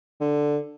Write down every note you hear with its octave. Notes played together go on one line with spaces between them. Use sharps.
D3